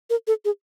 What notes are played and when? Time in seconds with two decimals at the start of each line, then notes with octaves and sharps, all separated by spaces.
0.10 A#4
0.27 A4
0.45 G#4